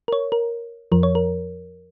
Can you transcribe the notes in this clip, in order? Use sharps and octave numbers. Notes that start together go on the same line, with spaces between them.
A#4
C#5
A#4
F2 F3 A#4
C#5
A#4